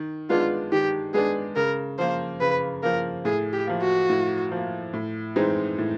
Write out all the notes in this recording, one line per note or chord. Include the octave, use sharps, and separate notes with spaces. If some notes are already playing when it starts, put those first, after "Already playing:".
Already playing: D#3
G#3 B3 D4 F4
D#3 G4
G#3 B3 D4 G#4
C#3 A#4
F3 A#3 C5
C#3 B4
F3 A#3 A#4
A2 G#4
G4
F3 A#3
F#4
A2
F3 A#3
A2
E3 G#3 C4 D#4
A2